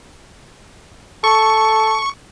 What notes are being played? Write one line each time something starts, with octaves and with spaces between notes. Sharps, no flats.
A4 C#6